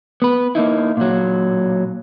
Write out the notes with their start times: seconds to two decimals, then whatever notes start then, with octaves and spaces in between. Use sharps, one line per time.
0.22 B3 B4
0.55 A#3 B3 D#4 E4
0.97 A#2 F#3